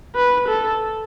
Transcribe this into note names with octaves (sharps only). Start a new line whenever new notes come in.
B4
A4